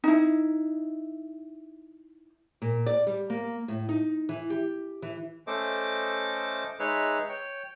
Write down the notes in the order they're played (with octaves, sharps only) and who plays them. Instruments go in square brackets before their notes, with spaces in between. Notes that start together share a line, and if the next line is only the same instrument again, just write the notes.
[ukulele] D#4 E4
[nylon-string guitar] A#2
D5
G3
A#3
A2
D#4
E3
G4
E3
[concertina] A3 C#4 A4 C5 D#5 D6
G#3 D#4 G#4 B4 C#5 E5
C#5 G5